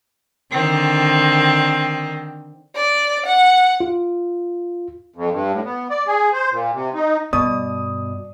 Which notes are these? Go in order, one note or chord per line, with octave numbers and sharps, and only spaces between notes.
D3 D#3 C4
D5
F#5
F4
F2
G2
A2
B3
D5
G#4
C5
A#2
C3
D#4
G2 B2 D5 D#6